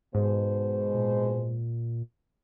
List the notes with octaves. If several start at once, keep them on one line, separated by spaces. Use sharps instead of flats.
G#2 B2 G#3 C5
A#2